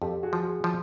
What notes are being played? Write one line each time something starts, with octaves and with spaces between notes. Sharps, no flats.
F2 G4 A4
F#4 G#4
F3
F#4 G#4
F3